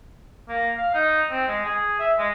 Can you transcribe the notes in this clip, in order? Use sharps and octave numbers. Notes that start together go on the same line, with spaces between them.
A#3
F5
D#4
C4
G#3
G#4
E5
G#3